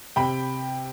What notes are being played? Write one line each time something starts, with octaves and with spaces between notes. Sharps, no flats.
C3 G5 B5